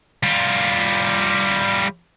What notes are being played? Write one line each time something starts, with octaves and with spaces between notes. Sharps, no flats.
G3 F4